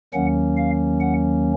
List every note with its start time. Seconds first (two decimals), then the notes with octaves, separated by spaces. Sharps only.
0.13 D#2 D#3 F#3 A#3 C#4 F#5
0.57 F5
1.01 F#5